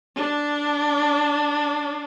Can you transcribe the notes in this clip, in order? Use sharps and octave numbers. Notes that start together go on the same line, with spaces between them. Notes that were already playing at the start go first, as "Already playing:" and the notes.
D4